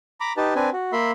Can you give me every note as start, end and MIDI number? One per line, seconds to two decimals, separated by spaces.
0.20 0.33 82
0.20 0.33 83
0.20 0.33 86
0.37 0.54 63
0.37 0.54 67
0.37 0.54 71
0.37 0.54 81
0.55 0.70 60
0.55 0.70 62
0.55 0.70 71
0.55 0.70 80
0.73 0.92 66
0.92 1.11 58
0.92 1.11 76
0.92 1.11 83
0.92 1.11 84